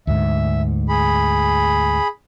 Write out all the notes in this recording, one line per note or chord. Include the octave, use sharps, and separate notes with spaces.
D2 G#2 E5
G#4 B5